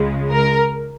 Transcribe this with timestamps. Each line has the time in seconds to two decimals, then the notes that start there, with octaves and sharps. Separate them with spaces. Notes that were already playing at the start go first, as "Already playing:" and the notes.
Already playing: C#2 C#3 G#3
0.31 A#4